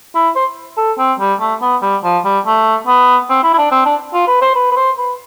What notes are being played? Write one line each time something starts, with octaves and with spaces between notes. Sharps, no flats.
E4
C5
A4
C4
G3
A3
B3
G3
F3
G3
A3
B3
C4
E4
E4
D4
C4
D4
F4
B4
C5
B4
B4
C5
B4